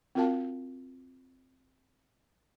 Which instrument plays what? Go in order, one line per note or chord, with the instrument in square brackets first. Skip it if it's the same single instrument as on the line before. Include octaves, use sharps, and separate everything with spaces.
[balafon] C4 F4 F#4 A#4 F5 A5